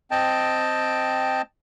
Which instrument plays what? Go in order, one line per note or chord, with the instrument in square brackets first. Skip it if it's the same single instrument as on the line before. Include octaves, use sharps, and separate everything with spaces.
[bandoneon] C4 D#5 G5 A5